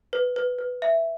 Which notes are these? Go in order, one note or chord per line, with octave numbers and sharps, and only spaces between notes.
B4
B4
B4
E5